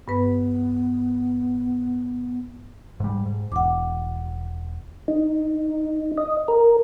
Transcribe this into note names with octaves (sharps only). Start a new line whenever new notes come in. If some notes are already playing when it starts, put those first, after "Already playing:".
G2 B3 B4
G#2 G3
G#2
E1 F#5 D6
D#4
D#5
A#4